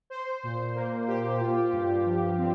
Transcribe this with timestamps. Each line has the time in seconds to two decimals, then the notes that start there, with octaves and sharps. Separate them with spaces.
0.10 C5
0.43 A#2
0.75 A#3
1.08 G4
1.41 F4
1.73 G2
2.06 F3
2.38 C4